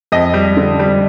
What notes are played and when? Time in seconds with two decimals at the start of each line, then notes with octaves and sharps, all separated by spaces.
0.12 F2 D#5
0.34 G3
0.57 D3
0.79 G3